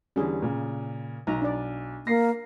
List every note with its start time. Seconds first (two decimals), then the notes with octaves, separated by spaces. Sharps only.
0.16 E2 D3 G3 C#4 G#4
0.42 A#2 C#3
1.27 B1 D#4 A#5
1.42 D4 D5
2.07 A#3 A#6 C7